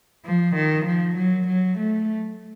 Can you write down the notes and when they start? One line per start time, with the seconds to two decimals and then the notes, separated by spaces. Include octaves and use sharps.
0.25 F3
0.56 D#3
0.85 F3
1.16 F#3
1.47 F#3
1.78 A3